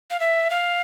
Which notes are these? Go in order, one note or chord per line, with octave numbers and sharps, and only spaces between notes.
F5
E5
F5